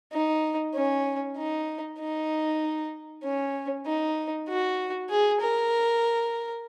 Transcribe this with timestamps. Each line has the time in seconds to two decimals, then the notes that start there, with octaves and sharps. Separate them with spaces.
0.13 D#4
0.74 C#4
1.37 D#4
1.99 D#4
3.24 C#4
3.86 D#4
4.49 F#4
5.10 G#4
5.41 A#4